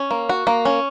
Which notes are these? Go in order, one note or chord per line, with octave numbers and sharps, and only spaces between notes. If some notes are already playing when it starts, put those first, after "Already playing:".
Already playing: C#4
A#3
F#4
A#3
C#4